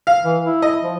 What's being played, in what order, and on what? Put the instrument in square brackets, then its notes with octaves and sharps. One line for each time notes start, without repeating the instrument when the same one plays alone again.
[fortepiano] F5
[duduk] E3
E4
[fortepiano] D#5
[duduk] F3